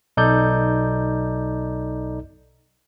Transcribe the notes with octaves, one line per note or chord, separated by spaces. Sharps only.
B1 D#4 A4 D5 G6